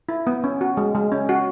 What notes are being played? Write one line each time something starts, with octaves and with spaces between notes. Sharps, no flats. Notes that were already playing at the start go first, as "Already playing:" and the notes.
E4
B3
C#4
F#4
G#3
G#3
C#4
F#4